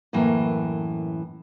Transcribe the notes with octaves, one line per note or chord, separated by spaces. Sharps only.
F#2 A2 E3 A#3